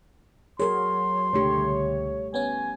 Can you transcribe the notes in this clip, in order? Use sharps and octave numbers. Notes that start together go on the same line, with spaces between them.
F#3 G#4 A#4 C#5 C6
C#2 B2 D3 A3 G4 C#5
G3
B3 C#4 G#5